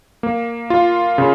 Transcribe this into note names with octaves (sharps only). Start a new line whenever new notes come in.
A#3
F4
C#3